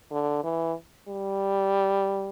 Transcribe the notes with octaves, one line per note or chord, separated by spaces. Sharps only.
D3
E3
G3